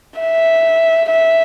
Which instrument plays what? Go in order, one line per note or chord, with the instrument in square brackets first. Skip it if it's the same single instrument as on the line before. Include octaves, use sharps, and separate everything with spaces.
[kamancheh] E5
E5